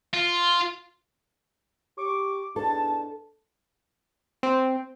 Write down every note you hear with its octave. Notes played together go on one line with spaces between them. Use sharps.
F4
G4 C#6 D6
E2 G#2 D4 A4 A5
C4